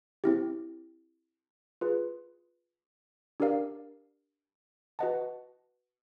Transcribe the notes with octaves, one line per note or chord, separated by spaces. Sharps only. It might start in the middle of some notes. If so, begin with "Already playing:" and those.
C4 E4 G4
F4 G#4 B4
D4 G4 A#4 D5 F5
F#4 B4 D#5 F#5 A5